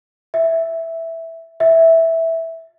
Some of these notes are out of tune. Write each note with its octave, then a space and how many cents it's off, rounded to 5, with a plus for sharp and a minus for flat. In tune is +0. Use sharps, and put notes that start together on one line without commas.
E5 +0
E5 -5